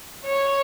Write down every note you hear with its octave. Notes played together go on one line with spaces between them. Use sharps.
C#5